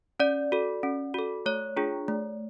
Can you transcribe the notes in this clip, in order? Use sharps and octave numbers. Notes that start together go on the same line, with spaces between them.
C#4 D5
F#4 A4
C#4
F#4 A4
A3 C#5
D4 F4 G#4
A3